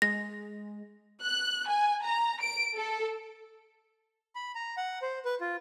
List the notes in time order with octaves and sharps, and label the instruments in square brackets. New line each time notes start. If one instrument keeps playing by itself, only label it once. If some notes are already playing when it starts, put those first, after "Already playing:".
[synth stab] G#3 [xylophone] A#6
[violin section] F#6
G#5
A#5
D7
A4
[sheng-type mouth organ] B5
A#5
F#5
C5
B4
F4